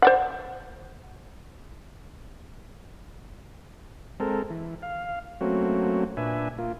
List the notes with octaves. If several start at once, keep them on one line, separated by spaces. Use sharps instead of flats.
C5 D5 F#5
G#3 C4 A4 A#4
E3
F5
F#3 A3 A#3 C4 C#4 F#4
A#2 D4 B4 E5 G#5
A#3 F4